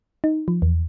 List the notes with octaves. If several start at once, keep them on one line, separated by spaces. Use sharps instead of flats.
D#4
F3
E2